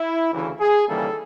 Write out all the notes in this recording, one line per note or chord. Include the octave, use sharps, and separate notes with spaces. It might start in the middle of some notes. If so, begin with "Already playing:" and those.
Already playing: E4
D2 C#3 E3
G#4
D#2 C#3 E3 G3 A#3 A4